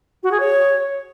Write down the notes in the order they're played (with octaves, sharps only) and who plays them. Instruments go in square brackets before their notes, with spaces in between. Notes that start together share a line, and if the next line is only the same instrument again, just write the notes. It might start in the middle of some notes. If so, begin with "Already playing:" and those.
[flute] F#4
G#4
C#5